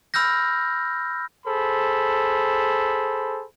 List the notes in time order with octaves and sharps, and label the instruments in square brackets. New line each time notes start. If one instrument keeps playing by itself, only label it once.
[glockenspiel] B5 E6 F6 G6 A#6
[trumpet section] G#4 A4 C5 B5